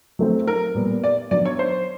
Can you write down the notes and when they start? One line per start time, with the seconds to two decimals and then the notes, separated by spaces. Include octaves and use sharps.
0.19 F#3 A3 C4
0.47 A#4
0.75 A#2 G3 B3
1.04 D5
1.31 F#3 B3 D4 D5
1.45 C#5
1.59 C5